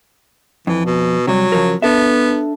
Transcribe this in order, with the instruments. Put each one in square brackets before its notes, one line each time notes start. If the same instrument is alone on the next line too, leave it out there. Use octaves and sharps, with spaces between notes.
[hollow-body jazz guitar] F2 [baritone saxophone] E3
[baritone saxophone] B2
[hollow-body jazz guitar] C3 G3 [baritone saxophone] F#3
[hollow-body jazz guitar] C#3 F3 A#4
[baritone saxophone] B3 [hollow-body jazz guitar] D4 A4 E5